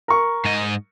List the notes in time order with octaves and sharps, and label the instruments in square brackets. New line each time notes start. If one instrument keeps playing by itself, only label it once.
[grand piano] A#4 C#6
[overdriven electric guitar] G#2 D#5